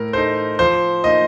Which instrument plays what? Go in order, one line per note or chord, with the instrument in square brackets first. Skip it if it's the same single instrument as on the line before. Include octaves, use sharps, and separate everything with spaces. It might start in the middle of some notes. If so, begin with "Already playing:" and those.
Already playing: [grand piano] A2 A#4
A3 D#4 C5
F3 C5
A#3 D#4 D#5